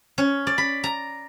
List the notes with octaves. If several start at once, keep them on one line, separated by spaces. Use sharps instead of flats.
C#4
D5
B5
A#5